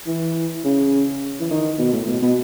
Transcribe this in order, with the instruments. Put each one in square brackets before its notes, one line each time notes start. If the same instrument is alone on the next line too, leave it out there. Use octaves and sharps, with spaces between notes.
[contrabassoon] E3
C#3
E3
D#3
B2
A2
B2
B2